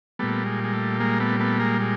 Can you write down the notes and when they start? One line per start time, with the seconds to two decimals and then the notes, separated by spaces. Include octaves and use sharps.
0.19 A#2 G3 A3 B3
0.45 G#3
0.64 G#3
0.73 A3
1.00 G#3 A#3
1.20 A3 B3
1.40 A3 B3
1.60 G#3 A#3
1.80 G#3